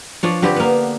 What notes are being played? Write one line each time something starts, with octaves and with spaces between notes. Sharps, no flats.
F3 D4 C#5
D3 C4 G4 B4
A#3 B3